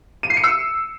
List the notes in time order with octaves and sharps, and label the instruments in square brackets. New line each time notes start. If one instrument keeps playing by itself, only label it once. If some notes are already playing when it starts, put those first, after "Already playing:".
[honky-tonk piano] D#7
C7
C#7
E6